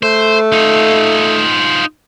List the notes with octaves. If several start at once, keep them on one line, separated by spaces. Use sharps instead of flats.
A3 C5
D#4 F4